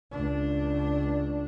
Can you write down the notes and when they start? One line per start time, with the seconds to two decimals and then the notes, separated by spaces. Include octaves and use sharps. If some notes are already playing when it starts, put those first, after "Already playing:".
0.12 C#2 D4